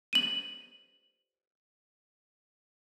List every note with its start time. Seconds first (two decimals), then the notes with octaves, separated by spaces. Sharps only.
0.13 D#7 F#7